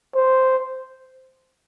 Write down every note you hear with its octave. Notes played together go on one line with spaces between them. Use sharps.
C5